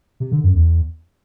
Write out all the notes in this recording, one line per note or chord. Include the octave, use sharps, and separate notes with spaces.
C3
D3
F#2
E2